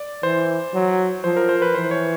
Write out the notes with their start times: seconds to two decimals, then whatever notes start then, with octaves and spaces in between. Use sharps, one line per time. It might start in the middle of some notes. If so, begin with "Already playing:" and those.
Already playing: D5
0.23 E3 C5
0.74 F#3
1.24 F3 C5
1.36 A#4
1.49 C5
1.62 B4
1.74 E3 C5
1.91 C#5